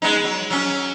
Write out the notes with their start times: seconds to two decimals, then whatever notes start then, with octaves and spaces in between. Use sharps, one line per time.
0.02 G#3 B3 D#4
0.24 F#3
0.50 F#3 C#4